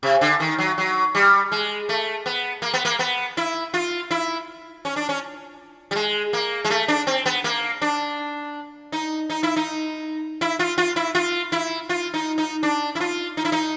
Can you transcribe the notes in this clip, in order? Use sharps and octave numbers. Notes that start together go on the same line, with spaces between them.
C3
D3
D#3
F#3
F#3
G3
G#3
A3
B3
A#3
B3
A#3
B3
E4
F4
E4
C#4
D4
C#4
G3
G#3
A#3
G#3
A3
D4
C4
B3
A#3
D4
D#4
D#4
E4
D#4
E4
F4
F4
E4
F4
E4
F4
D#4
D#4
D4
E4
F4
D#4
E4
D#4